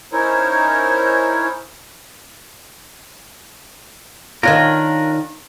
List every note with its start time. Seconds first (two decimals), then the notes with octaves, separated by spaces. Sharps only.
0.12 C#4 D#4 E4 A#4 C5 C#5
4.43 D#3 C#4 D4 F4 A#4